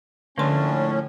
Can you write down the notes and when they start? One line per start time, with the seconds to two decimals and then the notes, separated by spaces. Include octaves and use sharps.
0.38 A2 D3 F3 A3 A#3 C#4 D4 C6